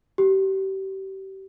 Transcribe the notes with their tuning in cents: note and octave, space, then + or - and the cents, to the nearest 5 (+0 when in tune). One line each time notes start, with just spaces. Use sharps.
G4 -30